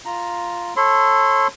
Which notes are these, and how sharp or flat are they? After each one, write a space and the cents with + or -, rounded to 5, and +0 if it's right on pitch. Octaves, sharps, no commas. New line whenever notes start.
F4 +0 A#5 +0
A4 +0 C#5 -35 C6 -35